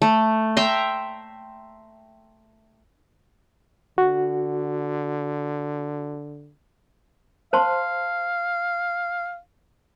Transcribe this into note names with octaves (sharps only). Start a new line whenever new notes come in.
A3
E5 G5 A#5 C6
D3 F#4
C5 F5 A5 C6